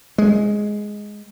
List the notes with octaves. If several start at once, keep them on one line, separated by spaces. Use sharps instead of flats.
G#3